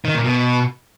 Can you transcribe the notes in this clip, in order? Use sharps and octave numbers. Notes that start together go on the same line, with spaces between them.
D#3
A#2
B2